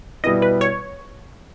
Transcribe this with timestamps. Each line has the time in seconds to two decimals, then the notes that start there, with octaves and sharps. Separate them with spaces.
0.24 B2 G3 B3 E4 D#5
0.42 B4
0.61 C#5